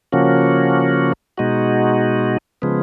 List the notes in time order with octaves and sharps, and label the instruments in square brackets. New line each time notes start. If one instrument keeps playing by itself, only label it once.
[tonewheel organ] C#3 F3 A#3 C#4 F#4
B2 G#3 D#4 F#4
C#3 F3 G#3 B3